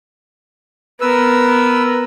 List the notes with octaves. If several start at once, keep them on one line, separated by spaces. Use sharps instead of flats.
B3 A#4 B4 E6